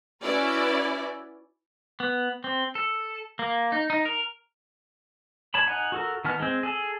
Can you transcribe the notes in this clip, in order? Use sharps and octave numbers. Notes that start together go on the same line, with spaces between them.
C#4 E4 F#4 B4 D5
B3
C4
A4
A#3
D#4
D#4
A#4
C#5 A5 B5
D#4 F#5 G#5
F#4 A4 A#4
D#3 B3 A5 F6
G#3 C4
G#4 A4